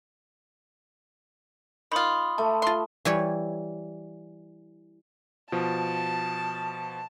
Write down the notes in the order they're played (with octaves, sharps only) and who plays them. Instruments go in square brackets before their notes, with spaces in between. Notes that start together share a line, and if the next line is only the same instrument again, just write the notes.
[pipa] D#3 F4 [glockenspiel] B5 C6 D#6
[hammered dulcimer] A3 [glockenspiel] A5
[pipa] F4 C6
[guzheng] E3 G3 C#5
[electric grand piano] B2 F3 [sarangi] A5